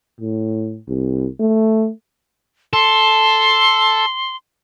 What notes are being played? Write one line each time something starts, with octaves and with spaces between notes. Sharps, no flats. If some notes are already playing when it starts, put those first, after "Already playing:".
A2
C2
A3
A4 C6